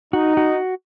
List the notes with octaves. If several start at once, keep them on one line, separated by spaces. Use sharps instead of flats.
D#4 F#4
F#4